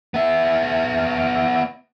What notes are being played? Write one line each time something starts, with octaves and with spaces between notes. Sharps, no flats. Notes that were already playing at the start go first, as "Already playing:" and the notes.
B3 E5